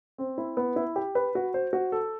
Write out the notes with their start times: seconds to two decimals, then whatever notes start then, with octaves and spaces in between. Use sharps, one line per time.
0.18 C4
0.38 E4
0.57 B3
0.76 E4
0.96 G4
1.15 B4
1.35 F#4
1.54 C5
1.73 F#4
1.92 A4